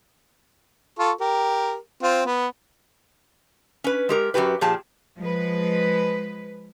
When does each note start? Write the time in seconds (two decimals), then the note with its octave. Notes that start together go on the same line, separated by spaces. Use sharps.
0.99 F4 A4 C#6
1.21 G4 A#4
2.03 C4 F4
2.26 B3
3.84 C#4 B4
4.09 G#3 G4 A#4
4.34 F#2 F3 F#4 G4 B4
4.61 A#2 F3 G4 G#4 A5
5.18 F3 G#3 B4